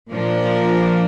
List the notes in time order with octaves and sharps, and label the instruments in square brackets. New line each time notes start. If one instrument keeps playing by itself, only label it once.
[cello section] A#2 F3 A#3 D4 A#4